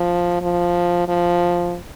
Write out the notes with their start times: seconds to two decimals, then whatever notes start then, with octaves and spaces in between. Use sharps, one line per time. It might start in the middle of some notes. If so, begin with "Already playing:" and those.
Already playing: F3
0.42 F3
1.08 F3